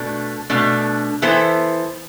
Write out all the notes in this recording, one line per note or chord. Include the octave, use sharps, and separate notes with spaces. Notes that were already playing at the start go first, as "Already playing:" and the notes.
Already playing: B2 A3 D4
B2 A3 D4
E3 B3 E4 A4 C5